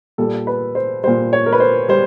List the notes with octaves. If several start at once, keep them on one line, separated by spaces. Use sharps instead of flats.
A#2 G3 A4
B4
C5
A#2 G3 C5
C#5
A#4
B4
C5
G3 C5